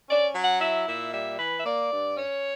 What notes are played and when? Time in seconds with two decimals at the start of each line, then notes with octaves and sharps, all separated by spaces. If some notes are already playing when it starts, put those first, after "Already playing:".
0.09 C#4 D5
0.35 F#3
0.44 F#5
0.61 E4 E5
0.87 A#2 E5
1.13 G3 E5
1.39 E3 B4
1.59 E5
1.65 A#3 D5
1.92 G2
2.17 C#4 C#5